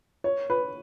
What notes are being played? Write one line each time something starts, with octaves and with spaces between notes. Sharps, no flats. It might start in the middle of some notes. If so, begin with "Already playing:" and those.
C#5
B4